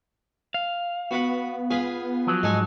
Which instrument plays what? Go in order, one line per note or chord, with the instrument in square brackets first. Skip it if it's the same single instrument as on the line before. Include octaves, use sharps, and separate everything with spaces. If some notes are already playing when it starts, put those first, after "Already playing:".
[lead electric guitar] F5
[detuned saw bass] B3 [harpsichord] F#4 B4 F#5
[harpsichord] F4 G#4 B4
[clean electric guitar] F3 F#3
[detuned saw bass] G#2 [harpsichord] G#3 A4 G#5